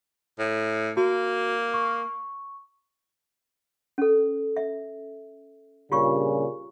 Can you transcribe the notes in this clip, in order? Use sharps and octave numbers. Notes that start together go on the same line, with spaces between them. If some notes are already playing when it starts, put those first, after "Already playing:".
A2
A#3 F#4
C#6
C#4 A4
E5
G2 A#2 C#3 F4 G4 C#6